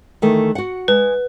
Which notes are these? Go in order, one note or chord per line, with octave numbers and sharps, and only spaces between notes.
D#3 E3 A3
F#4 F#5
G#3 B4